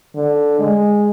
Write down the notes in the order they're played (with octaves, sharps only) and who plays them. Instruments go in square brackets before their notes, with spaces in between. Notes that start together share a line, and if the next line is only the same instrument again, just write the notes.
[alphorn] D3
G#3